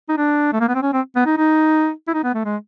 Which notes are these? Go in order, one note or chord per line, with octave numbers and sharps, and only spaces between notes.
D#4
D4
A3
A#3
B3
C4
C#4
C4
B3
D#4
D#4
E4
D#4
B3
A3
G#3